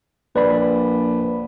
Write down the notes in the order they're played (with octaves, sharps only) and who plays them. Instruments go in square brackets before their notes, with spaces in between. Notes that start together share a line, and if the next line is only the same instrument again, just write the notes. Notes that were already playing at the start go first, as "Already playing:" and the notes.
[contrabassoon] A#1 [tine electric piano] B4 D5 B5